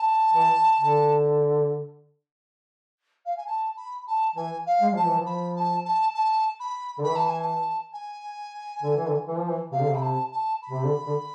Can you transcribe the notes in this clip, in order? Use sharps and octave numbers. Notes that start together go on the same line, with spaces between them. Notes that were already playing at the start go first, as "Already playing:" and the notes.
Already playing: A5
E3
D3
F5
G#5
A5
B5
A5
E3 G#5
F5
G#3
F3 A5
E3
F3
B5
A5
A5
A5
B5
D3
E3 B5
A5
G#5
A5
G#5
D3
E3
D3
E3
F3
E3
C3 F5
D3
C3
B5
A5
A5
B5
C3
D3
D3